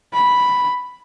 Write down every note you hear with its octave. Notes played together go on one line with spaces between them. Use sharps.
B5